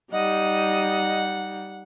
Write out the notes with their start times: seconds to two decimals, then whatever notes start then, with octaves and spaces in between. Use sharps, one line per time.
0.12 G3 D#4 D#5 F#5